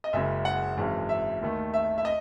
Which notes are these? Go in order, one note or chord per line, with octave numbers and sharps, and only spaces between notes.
D#5
F#1 F#2 C#3 G#3 E5
F#5
G#1 F#2 E3 G#3
E5
D#2 D#3 A3
E5
E5
D#5